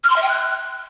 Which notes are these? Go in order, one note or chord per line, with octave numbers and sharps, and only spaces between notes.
F6
C6
E5
G5
F#6